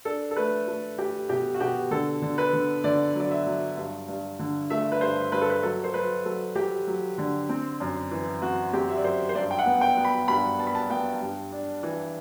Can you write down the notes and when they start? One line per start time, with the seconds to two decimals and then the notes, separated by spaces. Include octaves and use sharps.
0.05 D4 A4
0.31 A4
0.36 A3 B4
0.68 A3
0.98 A3 G4
1.29 B2 G4
1.54 F#4
1.60 B2 G4
1.91 D3 A4
2.22 D3
2.38 B4
2.53 D3
2.84 D3 D5
3.15 F#3 D5
3.31 E5
3.47 F#3
3.77 G2
4.08 G2
4.39 D3
4.70 A3 E5
4.92 B4
5.01 G2 C5
5.32 G2 B4
5.41 A4
5.50 B4
5.63 F#3 A4
5.84 C5
5.94 F#3 B4
6.25 F#3 A4
6.55 F#3 G4
6.87 F#3
7.18 D3
7.49 C4
7.80 F#2
8.11 E3
8.42 C4 F#4
8.73 C4 G4
8.89 E5
8.97 D5
9.04 F#2 C5
9.29 C5
9.35 G2 D5
9.51 G5
9.59 F#5
9.66 B3
9.81 G5
9.98 B3
10.05 B5
10.28 G2 B5
10.59 B3 A5
10.67 B5
10.75 A5
10.90 B3 G5
11.21 G2
11.52 D4
11.83 E3